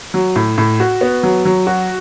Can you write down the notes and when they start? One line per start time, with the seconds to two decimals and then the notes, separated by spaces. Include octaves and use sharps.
0.14 F#3
0.36 A2
0.58 A2
0.80 F#4
1.01 B3
1.23 F#3
1.45 F#3
1.67 F#4